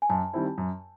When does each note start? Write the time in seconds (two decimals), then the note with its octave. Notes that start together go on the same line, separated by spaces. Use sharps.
0.02 G#5
0.09 F#2 A5
0.33 D#3 G3 C4 E4
0.58 F#2